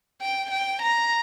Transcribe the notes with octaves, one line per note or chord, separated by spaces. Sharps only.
G5
G5
A#5